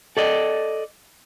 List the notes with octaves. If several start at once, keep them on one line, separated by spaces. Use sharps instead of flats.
A4 D5 D#5